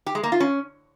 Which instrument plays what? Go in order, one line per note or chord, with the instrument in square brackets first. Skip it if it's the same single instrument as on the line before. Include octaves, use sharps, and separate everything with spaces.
[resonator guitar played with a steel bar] G4
G#3
A#3
F4
C#4